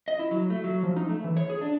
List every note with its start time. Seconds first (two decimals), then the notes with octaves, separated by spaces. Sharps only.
0.08 D#5
0.19 E4
0.31 F#3
0.50 A3
0.64 F#3
0.83 F3
0.96 D#4
1.09 A3
1.24 E3
1.37 C#5
1.50 G#4
1.61 D4